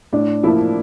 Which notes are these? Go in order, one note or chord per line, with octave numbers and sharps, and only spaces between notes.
A2 D4
F3 A#3 D4 E4